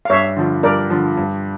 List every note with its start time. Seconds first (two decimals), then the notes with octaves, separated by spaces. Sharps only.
0.05 F5
0.10 G2 C#5 E5
0.37 D3 F3
0.63 G2 A#4 D5
0.90 D3 F3
1.17 G2